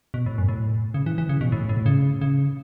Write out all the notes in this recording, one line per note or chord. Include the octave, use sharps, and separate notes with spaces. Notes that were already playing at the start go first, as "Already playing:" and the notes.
B2
A2
F#2
A2
C#3
E3
E3
C#3
B2
A2
A2
C#3
C#3